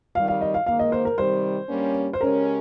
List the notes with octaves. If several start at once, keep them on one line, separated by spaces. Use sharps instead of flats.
F2 D#3 G3 F5
F5
D#5
F5
G#2 D#3 A#3 F5
D#5
C5
A#4
C3 D#3 G3 C5
G2 G3 A#3 C#4
C5
C#3 G#3 C#4 G4 A#4